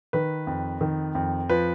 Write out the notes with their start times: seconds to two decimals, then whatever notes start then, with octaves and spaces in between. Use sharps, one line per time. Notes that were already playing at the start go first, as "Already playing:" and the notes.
0.13 D#3 B4
0.47 F2
0.81 D#3
1.15 F2
1.49 F3 B4